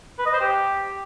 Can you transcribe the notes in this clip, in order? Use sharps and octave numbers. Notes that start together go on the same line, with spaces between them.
B4
D#5
C5
G4